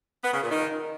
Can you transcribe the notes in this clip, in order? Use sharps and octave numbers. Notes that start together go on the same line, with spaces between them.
B3
C#3
A#2
D#3